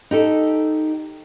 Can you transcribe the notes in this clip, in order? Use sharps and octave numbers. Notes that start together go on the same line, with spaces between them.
D#4 G4 A4